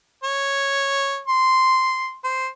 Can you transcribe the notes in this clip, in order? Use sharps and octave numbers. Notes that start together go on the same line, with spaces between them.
C#5
C6
C5